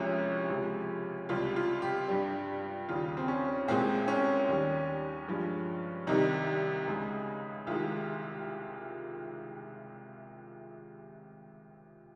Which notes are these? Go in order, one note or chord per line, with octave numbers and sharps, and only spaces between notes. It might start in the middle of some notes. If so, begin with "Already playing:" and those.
Already playing: C2 C3 F3 G#3 C#4
C#2 C3 F3 G#3
C#2 C3 G3 F4
F4
G4
G2 G3 G4
D#2 C#3 G3 F4
C4
C#4
C2 A#2 G#3 C4
C#4
D#2 D#3 G3
G2 F3 G#3
C2 C3 D#3 G3 D#4
C#2 C#3 G#3
C2 C3 D#3 G#3 F4